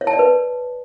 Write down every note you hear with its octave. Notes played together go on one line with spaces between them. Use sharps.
C#5
A5
D5
B4